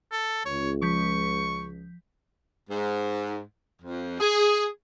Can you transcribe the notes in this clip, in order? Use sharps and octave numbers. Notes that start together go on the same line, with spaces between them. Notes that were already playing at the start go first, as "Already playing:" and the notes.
A4
C#2 C#5
F3 C#6 G6 B6
G#2
F2
G#4